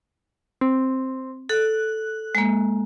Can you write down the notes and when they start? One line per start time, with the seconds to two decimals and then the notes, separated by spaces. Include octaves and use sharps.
0.61 C4
1.49 A4 F#6
2.35 G#3 A#3